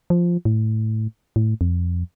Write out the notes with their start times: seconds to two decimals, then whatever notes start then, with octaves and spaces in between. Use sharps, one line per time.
0.10 F3
0.45 A2
1.36 A2
1.61 F2